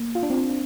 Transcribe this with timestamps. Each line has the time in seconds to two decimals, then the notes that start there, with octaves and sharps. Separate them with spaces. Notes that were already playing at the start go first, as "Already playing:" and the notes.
Already playing: A#3
0.15 F4
0.23 D4
0.30 C4
0.38 D4